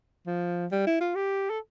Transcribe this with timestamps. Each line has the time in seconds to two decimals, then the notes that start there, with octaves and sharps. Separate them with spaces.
0.27 F3
0.71 G3
0.87 E4
1.01 F4
1.15 G4
1.50 A4